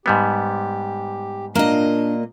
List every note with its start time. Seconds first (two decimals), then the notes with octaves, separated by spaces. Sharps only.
0.06 G#2 G3 B3 G4
1.55 A#2 A#3 D4 D#5